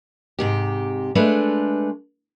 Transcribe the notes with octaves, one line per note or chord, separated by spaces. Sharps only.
G#2 C3 G4
G#3 A3 D4 A4 B4